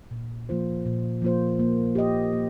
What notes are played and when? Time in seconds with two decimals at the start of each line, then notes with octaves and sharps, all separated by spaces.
0.11 A#2
0.49 F3 A#3 F4 C5
0.86 A#2
1.22 F3 A#3 F4 C5
1.59 A#3
1.95 G4 D#5
2.33 A#3